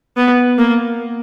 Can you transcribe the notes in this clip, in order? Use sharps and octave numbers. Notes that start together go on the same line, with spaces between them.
B3
A#3